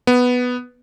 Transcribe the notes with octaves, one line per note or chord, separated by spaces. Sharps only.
B3